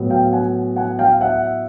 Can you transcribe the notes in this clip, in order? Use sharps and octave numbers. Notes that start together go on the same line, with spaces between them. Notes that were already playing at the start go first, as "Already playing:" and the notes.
Already playing: A2 F#3 B3
F5 G5
F#5 G#5
F#5 G#5
F5 G5
E5 F#5